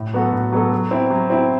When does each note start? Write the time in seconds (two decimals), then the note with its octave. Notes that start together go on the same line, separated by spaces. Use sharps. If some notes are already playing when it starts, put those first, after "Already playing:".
Already playing: A2
0.13 F#3 B3 F#4 A4
0.33 A2
0.52 F#3 B3 F#4 A4
0.72 F#3
0.91 C4 E4
1.10 F#3
1.30 C4 E4